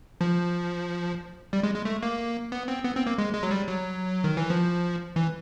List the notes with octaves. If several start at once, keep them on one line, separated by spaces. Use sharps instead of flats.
F3
G3
G#3
G#3
A3
A#3
B3
C4
B3
C4
A#3
G#3
G#3
F#3
G3
F#3
D#3
E3
F3
E3